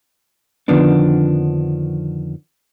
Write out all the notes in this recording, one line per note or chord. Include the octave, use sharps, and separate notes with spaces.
F2 D3 D#3 F3 B3 D4